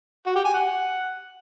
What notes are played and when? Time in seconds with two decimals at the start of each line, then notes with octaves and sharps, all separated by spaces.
0.26 F#4
0.36 G4
0.45 G#5
0.54 F#5